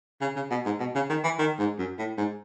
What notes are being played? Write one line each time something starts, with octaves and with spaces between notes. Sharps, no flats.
C#3
C#3
B2
G#2
B2
C#3
D#3
E3
D#3
G#2
F#2
A2
G#2